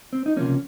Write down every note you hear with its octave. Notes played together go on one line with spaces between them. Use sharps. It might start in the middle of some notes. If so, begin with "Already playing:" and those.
C4
D#4
C#2 C3 F3 A#3 C#4